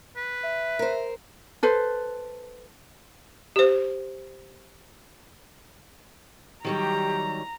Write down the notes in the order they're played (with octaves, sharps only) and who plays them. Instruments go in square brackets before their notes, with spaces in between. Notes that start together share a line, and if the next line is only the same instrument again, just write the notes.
[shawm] B4
[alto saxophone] E5
[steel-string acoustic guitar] A#4 C5
[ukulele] A4 B4 C5
[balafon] G4 C5
[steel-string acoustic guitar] D#3 F#3 G3 [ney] G4 [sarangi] A#5